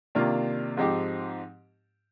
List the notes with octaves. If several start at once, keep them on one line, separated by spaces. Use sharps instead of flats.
C3 D#3 A#3 D4 F4
G#2 F3 C4 D#4 G4